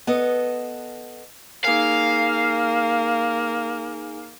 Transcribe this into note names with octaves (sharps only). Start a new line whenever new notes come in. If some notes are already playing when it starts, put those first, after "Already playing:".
B3 A4 D#5
A#3 D#4 G#4 F5 G#5